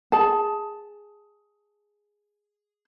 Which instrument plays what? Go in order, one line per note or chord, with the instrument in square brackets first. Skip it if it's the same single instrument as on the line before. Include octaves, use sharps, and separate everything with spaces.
[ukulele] G#4 A5